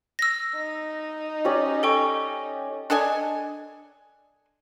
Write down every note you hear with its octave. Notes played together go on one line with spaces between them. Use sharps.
E6 A#6
D#4
C#4 G4 D5
A4 G5 C#6
D4 A4 D#5 G#5